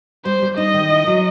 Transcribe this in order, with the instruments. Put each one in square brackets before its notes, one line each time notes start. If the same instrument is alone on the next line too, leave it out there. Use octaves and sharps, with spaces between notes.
[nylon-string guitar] G3 [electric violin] C5
[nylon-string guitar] G3
[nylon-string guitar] D#4 [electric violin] D#5
[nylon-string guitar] D#3
E4
F#3